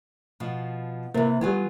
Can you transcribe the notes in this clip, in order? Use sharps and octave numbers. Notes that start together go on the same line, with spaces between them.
B2 F3
C3 E3 A#3
E3 G3 B3 F4 G#5